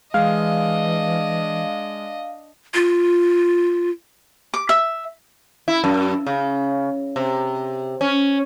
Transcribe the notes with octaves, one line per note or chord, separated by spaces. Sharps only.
E3 G#3 D4 D#5 F5
F4
D6
E5
E4
F#2
C#3
C3
C#4